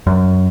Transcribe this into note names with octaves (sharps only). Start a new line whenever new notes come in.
F#2